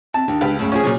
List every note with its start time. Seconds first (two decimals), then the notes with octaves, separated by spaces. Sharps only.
0.14 C4 A5
0.28 D#2 D4
0.41 C#2 G4 B4 F5
0.59 F#2 C#3 A3
0.72 F3 C#4 G#4
0.84 A#2 F#3